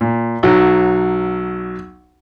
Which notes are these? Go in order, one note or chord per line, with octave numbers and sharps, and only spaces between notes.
A#2
B1 F#3